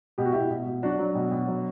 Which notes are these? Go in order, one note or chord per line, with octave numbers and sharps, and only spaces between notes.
B2 G4
F#4
B2 E4 G4
B2
B2
F#3 D4 F#4
F#3
B2
B2
F#3